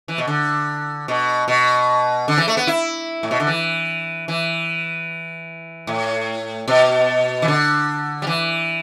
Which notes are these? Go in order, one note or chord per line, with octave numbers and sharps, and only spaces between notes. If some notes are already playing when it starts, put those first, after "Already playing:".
E3
B2
D3
B2
B2
D3
E3
A3
B3
E4
A2
B2
D3
E3
E3
A2
B2
E3
D3
G3
E3